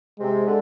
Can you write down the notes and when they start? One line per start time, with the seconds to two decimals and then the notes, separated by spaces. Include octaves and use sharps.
0.20 C3 G#3
0.46 D3